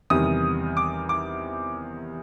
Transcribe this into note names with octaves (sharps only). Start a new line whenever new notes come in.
E2 C3 D#3 G3 D#6
D6
D6